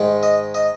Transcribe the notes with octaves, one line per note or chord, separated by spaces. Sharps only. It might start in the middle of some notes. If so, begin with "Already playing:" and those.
Already playing: G#2 D#3 G#3
D#5
D#5